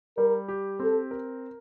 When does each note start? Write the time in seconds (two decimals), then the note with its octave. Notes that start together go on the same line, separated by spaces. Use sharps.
0.17 G3 A#4
0.48 G4
0.80 C4 A4
1.11 A#4